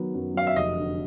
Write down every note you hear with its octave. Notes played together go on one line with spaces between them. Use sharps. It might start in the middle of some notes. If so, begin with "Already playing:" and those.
Already playing: D#3 F#3 B3
F#2
F#3 F5
E5
F1 D#5
D3